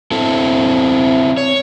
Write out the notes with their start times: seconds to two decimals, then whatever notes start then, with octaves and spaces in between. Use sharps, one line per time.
0.11 C4 E4 A4
1.37 C#5